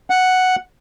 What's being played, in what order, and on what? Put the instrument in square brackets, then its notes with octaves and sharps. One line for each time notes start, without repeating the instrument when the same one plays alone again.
[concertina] F#5